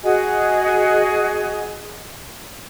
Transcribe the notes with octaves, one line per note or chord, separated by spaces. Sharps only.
F#4 G#4 D#5 G#5